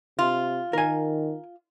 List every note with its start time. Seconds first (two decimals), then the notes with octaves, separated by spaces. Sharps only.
0.19 C3 F4
0.73 D#3 A#4 G#5